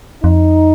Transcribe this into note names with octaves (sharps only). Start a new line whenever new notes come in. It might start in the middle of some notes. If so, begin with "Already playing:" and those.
F2 D#4